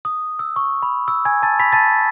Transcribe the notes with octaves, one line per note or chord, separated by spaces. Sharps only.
D#6
E6
C#6
B5
E6
G#5 G#6
A5 A6
B5 B6
A5 A6